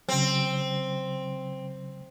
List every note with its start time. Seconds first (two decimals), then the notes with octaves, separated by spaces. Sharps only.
0.09 C#3 F#3 C4